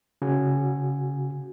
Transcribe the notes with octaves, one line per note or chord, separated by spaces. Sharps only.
C#3 F#4 G#5